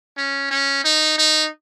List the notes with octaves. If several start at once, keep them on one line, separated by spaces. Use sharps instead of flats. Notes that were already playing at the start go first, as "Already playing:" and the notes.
C#4
C#4
D#4
D#4